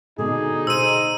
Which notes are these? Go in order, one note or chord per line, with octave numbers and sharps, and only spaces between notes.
B2 D3 D#4 G#4
G#4 C5 E6 D#7